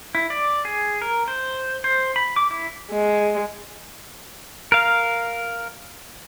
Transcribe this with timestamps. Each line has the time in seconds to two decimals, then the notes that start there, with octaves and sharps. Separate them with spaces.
0.15 E4
0.30 D5
0.65 G#4
1.02 A#4
1.28 C5
1.84 C5
2.16 B5
2.36 D6
2.51 E4
2.91 G#3
4.72 A#4 F5